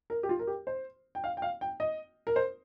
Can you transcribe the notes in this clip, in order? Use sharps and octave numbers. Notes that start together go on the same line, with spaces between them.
A#4
G4
F4
A#4
G4
C5
G5
F5
G5
F5
G5
D#5
A#4
C5